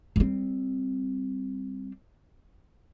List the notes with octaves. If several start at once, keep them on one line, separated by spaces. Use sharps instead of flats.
G3 C4